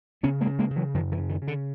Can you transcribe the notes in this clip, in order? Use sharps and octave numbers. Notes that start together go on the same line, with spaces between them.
C#3 B3 C#4
G#3 A#3
C#3
G#3 A#3
C#3
E3 F#3
F#2 D#3 F3
D3 E3
C#3
D#3
C#3
D3